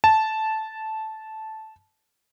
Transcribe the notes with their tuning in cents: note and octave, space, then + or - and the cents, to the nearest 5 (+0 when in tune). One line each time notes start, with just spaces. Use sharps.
A5 -10